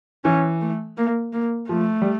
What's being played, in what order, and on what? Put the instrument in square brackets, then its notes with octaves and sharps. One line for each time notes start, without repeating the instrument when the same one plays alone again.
[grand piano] E3 [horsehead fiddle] C#4
[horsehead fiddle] A3
A#3
A#3
[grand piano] F3 [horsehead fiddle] A3
[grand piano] G3